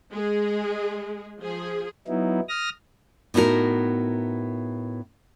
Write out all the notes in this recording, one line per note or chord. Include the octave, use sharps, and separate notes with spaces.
G#3 G#4
F3 G#4
F#3 B3 D#4 E4
D#6 F6 A#6
A2 B3 D#4 E4 F#4 A#4